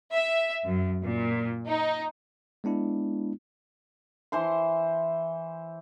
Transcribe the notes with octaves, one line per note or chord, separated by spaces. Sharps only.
E5
F#2
A#2
D#4
G#3 B3 D4 E4
E3 C5 C6